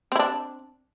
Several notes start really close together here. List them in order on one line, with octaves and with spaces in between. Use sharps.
C4 E4 D4